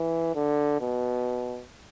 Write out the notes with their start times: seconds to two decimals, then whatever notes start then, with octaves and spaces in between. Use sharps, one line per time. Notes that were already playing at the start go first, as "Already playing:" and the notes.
Already playing: E3
0.35 D3
0.81 B2